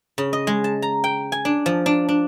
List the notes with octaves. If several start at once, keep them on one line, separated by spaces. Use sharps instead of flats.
C#3
D#5
G#3
A5
A#5
G5
G#5
D4
F3
D4
D4